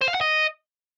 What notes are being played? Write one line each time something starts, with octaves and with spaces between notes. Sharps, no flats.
C5
F5
F#5
D#5